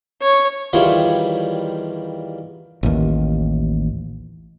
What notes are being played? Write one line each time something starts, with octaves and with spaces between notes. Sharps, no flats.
C#5
E2 D#3 G3 F4 C#5 E5
A1 D#2